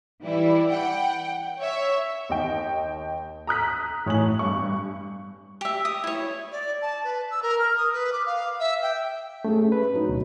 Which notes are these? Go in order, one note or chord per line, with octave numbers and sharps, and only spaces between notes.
E3 G3 E4
F#5 G5
C#5 E5
D#2 D#5 G5
A#5 D#6 F#6 B6
A2 C#5 G#5 F#7
G2 C#6
G4 E5
D#6
E4 C#5
D5
A5
B4
E6
A#4
F6
D#6
B4
D6
F5
E5
G5
A3 C#4 G#4
B4
F#3 D#4
D2 B2